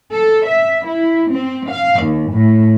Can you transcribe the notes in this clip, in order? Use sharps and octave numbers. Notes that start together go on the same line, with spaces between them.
A4
E5
E4
C4
F5
D#2
A2